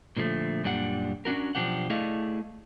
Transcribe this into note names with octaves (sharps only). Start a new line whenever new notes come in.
A#2 D3 F3 G#3 A3
F#2 A#2 G3 D4 F#5
C#4 D4 F#4 A#4
B1 D#3 F3 D4 G4 F#5
A3 E4 G#4 D5 D#5 F5